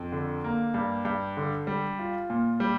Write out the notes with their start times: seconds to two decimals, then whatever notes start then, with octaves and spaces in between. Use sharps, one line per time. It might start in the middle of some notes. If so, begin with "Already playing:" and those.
Already playing: F2
0.12 D3
0.44 A#3
0.74 G2
1.05 G2
1.37 D3
1.67 G3
1.99 F4
2.30 A#2
2.60 G3